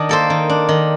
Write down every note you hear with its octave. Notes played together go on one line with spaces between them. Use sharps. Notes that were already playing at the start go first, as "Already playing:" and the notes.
Already playing: D#3 D4 D#5
A#3 A4 C5
D#3
D4
D#3